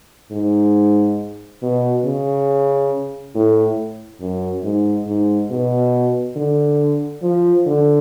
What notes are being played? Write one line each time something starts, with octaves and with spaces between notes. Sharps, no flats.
G#2
B2
C#3
A2
F#2
G#2
G#2
B2
D3
F3
D3